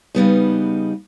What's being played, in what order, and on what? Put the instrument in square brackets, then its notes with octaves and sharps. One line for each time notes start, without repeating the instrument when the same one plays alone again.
[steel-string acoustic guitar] C#3 G3 B3 D#4